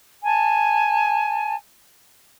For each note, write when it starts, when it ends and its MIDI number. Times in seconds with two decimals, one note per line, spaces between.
0.24 1.55 80
0.24 1.55 81